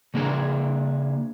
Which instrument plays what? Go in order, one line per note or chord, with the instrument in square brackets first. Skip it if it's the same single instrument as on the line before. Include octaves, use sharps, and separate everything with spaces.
[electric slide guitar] C#3 A#3 D4 G#4